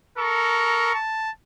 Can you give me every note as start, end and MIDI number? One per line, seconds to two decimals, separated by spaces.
0.18 0.93 69
0.18 0.91 70
0.18 0.93 82
0.18 0.93 85
0.94 1.30 81